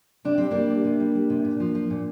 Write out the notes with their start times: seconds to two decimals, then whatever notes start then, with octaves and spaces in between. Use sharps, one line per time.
0.25 C3 D4
0.38 G3 C4
0.51 G3 A#3 D4
0.69 C3
0.85 C3
1.00 G3
1.15 G3
1.30 C3
1.45 A#2
1.60 F3
1.75 F3
1.90 A#2